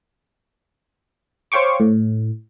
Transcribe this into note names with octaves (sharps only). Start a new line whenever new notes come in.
C5 C#5 F5 G5 C#6 D6
A2